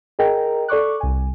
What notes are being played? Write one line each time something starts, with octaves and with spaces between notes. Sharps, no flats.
G#4 A#4 D#5 G5 A#5
A4 D5 C#6 D6 F#6
C2 G#5